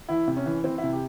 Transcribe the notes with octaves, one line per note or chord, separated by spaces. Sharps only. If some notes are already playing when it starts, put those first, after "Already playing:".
E3 E4
C3
C#4
E3
E3 C4
E4
C3
G4